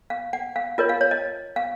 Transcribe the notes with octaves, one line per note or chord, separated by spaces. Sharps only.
F5
F#5
F5
F4 A#4 C#5 D#5
F5
C#5
D#5
F5